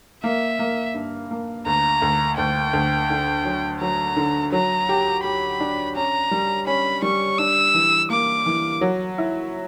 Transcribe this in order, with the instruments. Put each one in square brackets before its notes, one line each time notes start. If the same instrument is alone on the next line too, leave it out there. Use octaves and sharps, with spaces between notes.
[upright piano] A#3 [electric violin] E5
[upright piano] A#3
G2
A#3
[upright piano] D2 [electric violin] A#5
[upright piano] D2
[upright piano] D2 [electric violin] G5
[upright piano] D2
D3
F#3
[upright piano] F#3 [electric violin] A#5
[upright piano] D3
[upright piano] F#3 [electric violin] A#5
[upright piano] G4
[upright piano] G4 [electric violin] B5
[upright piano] D4
[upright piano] C#4 [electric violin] A#5
[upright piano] G3
[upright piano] C#4 [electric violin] B5
[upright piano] G3 [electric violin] C#6
[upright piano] D4 [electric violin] E6
[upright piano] E3
[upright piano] A#3 [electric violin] D6
[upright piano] E3
F#3
E4